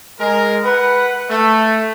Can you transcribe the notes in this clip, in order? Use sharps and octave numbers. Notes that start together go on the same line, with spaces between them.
G#3 A#4
B4 F#5
A3